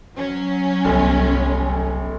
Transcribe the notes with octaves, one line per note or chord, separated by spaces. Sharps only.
F#3 C#4
D1 G1 C2 G#5